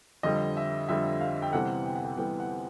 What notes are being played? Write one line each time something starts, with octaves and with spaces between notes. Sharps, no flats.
F2 D3 G3 D#5
E5
F2 D3 G3 E5
F5
G5
C3 E3 G3 B3 F#5
G5
F#5
G5
C3 E3 G3 B3 G5
F#5